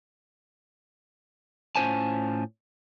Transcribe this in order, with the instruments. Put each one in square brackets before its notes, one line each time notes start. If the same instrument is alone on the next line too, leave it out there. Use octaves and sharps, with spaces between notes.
[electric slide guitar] A2 C#4 F4 C5 G#5 A5